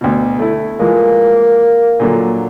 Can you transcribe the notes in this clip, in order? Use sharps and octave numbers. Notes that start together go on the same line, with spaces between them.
D2 B2
A3 E4
E3 F3 G#3 A#3
A#2 D3 F#3